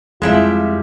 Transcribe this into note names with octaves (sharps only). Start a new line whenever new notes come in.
F2 F3 G3 G#3 E4 F4 E5